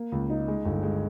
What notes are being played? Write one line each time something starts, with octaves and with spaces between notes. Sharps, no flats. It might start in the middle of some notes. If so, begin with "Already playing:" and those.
Already playing: A#3
C#2
D#4
G#3
G1
G#3